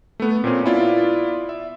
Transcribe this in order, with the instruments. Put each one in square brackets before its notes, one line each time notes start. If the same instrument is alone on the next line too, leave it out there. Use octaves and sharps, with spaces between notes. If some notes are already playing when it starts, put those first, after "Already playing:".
[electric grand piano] A3 B3
A#2 C4 C#4
B3 E4 F4 D5
E5